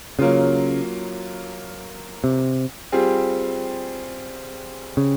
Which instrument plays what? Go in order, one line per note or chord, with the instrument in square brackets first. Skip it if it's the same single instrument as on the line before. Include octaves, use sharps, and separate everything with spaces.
[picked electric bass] C#3 [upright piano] F#3 A#3 C#4 F4
[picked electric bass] C3
[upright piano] G3 C4 F4 G#4
[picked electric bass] C#3